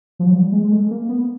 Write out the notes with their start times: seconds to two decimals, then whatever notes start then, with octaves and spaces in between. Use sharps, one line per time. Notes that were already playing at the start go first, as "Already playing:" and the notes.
0.19 F3
0.26 F#3
0.33 G3
0.52 G#3
0.64 G#3
0.72 A3
0.90 A#3
1.09 B3